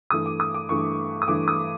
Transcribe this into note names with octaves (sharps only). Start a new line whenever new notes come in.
G2 E3 A3 D#6
D6
D#6
D6
G2 E3 A3 C#6
D#6
G2 E3 A3 D6
D#6